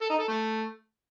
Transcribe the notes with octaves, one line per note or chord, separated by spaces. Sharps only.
A4
D#4
A4
A3